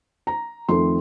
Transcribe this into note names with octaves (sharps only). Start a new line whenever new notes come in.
A#5
F2 D#3 A3 C4 C6